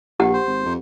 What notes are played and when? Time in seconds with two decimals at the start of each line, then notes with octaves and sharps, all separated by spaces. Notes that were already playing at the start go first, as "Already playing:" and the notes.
0.20 A#1 G4 F#5
0.33 C5
0.47 G#1
0.65 F2